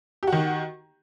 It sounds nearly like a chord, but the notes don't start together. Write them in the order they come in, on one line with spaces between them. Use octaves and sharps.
G4 F#4 D#3